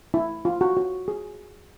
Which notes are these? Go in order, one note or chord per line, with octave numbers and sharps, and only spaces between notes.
E4
F4
F#4
F#4
G#4